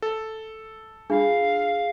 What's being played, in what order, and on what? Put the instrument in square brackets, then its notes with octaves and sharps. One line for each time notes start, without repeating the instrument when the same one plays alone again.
[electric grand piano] A4
[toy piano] D4 F4 [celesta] G#4 [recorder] F5